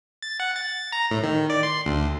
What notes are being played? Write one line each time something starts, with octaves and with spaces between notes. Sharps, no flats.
A6
F#5
A6
A#5
A2
D#3
D5
C6
D2